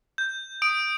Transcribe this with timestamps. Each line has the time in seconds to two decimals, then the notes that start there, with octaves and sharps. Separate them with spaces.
0.18 G6
0.62 D#6 D7